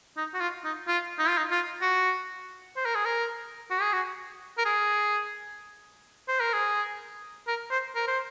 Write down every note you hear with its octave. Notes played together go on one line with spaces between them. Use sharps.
D#4
F#4
F4
D#4
F4
D#4
F4
D#4
F4
F#4
C5
A#4
G#4
A#4
F#4
G#4
F#4
A#4
G#4
C5
A#4
G#4
A#4
C5
A#4
C5